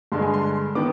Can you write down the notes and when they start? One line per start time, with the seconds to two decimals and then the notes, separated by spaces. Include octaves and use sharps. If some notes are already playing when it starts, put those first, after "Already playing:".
0.12 G2 D3 G#3 D4 C6
0.22 G#5
0.34 C6
0.75 D#3 B3 D6